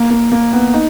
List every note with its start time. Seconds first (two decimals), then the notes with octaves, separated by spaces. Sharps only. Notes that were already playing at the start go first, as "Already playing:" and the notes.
Already playing: A#3
0.10 A#3
0.32 A#3
0.53 B3
0.74 D#4